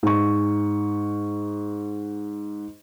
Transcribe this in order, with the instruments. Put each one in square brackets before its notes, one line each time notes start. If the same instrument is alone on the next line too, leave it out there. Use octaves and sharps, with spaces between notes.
[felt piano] G#2 C#6